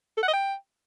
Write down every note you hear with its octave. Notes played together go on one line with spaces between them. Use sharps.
A4
F#5
D#5
G5